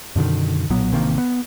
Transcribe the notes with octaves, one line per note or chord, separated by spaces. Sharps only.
F#2 B2 D3 D#3
B1 A#2 F#3 B3
A1 C3 D#3 A#3
B3